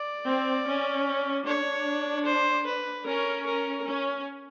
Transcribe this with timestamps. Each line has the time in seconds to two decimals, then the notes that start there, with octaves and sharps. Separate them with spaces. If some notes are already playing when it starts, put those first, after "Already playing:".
Already playing: D5
0.27 C4
0.66 C#4
1.46 D4 C#5
2.25 C5
2.66 B4
3.06 C#4 A#4
3.46 A#4
3.86 C#4